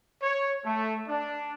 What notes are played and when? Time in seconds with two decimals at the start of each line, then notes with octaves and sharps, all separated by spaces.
0.22 C#5
0.64 A3
1.08 D4